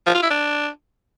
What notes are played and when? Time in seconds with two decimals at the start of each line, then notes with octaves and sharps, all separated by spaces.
0.06 F3
0.14 F4
0.22 E4
0.30 D4